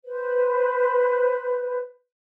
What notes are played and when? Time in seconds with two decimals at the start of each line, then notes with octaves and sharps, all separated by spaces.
0.05 B4 C5